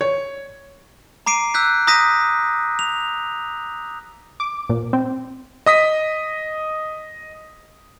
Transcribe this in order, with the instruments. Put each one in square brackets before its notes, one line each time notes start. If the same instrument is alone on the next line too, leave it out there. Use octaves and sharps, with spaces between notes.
[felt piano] C#5
[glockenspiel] A#5 D6 C7 D7 D#7
E6 F#6 G6 B6
A#5 D#6 G6 A#6 B6 D#7
F7
[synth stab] D6
A#2
C4
[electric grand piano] D#5 D#6 B6